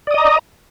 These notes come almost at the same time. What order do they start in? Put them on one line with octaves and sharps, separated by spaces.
D5 D#6 D#5 A#5